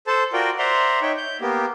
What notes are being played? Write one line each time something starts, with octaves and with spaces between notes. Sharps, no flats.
A4 C5 A5
F4 F#4 A#4 D5 G5
C5 D5 E5 F#5 A#5 C6
D#4 C#5 E5 G5
G6
A#3 B3 G4